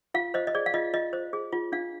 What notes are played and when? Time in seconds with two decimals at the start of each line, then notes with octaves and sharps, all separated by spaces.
0.14 F4 F5
0.34 C5 D#5
0.47 D#5
0.55 G#4 D5
0.66 F5
0.74 F4 D#5
0.94 F4 D#5
1.13 C5
1.33 G#4
1.52 F4
1.72 D4 F5